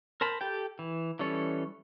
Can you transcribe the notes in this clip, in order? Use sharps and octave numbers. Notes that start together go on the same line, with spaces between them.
A#4 C5 A5 B5
G4 A4 G5
E3
E3 G3 C#4 A4 C#5